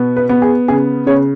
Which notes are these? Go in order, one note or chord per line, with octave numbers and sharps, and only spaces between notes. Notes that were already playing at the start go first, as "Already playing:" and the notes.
Already playing: B2 B3
B4
B3
G#4
C#3 G#4
C#3 C#5